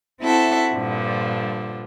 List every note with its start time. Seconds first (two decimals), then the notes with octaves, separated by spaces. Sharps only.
0.20 C4 E4 F#4 A4 E5
0.72 G2 A#2 D3 F3